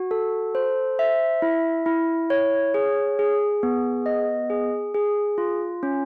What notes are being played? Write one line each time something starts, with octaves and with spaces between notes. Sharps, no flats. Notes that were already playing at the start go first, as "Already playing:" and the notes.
Already playing: F#4
A4
C5
E5
E4
E4
C#5
G#4
G#4
B3
D#5
G#4
G#4
F4
C#4